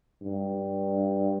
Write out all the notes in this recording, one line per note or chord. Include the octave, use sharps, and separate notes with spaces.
G2